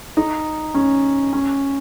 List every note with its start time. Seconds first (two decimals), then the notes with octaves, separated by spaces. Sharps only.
0.17 D#4
0.74 C#4
1.33 C#4